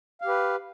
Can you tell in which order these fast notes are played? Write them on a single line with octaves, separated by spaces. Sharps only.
F5 G4 B4